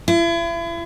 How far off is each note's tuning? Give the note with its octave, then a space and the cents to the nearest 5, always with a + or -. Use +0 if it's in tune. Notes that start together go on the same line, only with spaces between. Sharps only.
E4 +40